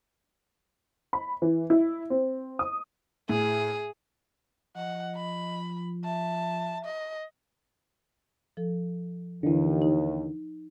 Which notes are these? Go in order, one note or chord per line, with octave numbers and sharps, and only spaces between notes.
B5
E3
E4
C4
D#6
A2 G#4
F3 D#5 F#5
B5
E5 A5
D#5
F3 A4
D#2 D3 E3
D#4